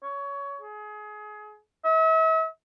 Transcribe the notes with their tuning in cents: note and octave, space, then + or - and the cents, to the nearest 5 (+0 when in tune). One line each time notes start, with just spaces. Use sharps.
C#5 +20
G#4 +25
E5 -40